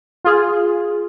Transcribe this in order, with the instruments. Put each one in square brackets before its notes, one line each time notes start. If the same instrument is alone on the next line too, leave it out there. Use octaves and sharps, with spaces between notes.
[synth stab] F4 G#4